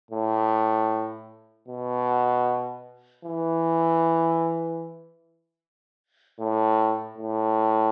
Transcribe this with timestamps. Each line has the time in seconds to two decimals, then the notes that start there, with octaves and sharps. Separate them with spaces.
0.11 A2
1.68 B2
3.25 E3
6.39 A2
7.18 A2